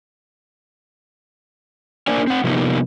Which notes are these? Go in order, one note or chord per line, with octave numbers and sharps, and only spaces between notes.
A#3 D4 A#4 C5 D5 G#5
C4 F#5
C3 F3 G3 A#3 B3 D#4